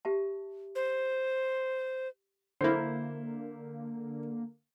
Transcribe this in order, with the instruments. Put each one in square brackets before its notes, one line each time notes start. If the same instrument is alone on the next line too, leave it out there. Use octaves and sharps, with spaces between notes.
[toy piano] G4 E5 A5
[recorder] C5
[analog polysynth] D3 A#3 [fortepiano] E4 C5